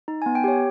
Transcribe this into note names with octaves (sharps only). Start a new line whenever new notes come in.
D#4
B3 G#5
G5
G4 C#5